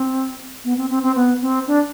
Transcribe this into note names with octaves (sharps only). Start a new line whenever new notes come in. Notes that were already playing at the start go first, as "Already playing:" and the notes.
Already playing: C4
B3
C4
C4
C4
B3
C4
D4